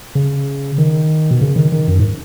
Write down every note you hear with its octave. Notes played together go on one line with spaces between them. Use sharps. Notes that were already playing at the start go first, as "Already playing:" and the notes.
C#3
D#3
B2
C#3
D#3
D#3
F#2
G#2